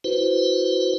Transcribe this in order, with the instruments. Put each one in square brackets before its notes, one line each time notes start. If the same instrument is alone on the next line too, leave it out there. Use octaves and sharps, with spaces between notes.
[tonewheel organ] E4 F#4 B4 C5